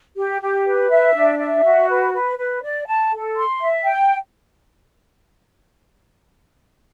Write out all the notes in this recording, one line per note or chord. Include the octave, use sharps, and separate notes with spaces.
G4
G4
B4
E5
D4
E5
F#4
B4
B4
B4
D5
A5
A4
C6
E5
G5